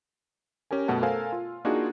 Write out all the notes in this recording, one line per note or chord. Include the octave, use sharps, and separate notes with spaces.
C#4 G4 A#4 G#5
F#2 B2 A3 F#5 A5
A4 A#4 C5 F5 G#5 E6
F4
A#3 D4 D#4 F4 F#4 G#4